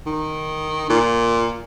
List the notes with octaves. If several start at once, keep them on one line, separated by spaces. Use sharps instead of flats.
D#3
A#2